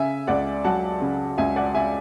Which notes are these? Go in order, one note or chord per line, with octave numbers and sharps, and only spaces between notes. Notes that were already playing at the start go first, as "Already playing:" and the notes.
Already playing: C#3 E5 G#5
C#2 D5 F#5
F#3 F#5 A5
C#3
C#2 E5 G#5
D5 F#5
C#3 E5 G#5